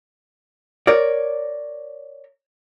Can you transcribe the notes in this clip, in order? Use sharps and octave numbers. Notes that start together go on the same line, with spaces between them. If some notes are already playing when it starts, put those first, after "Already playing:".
A#4 C#5 D5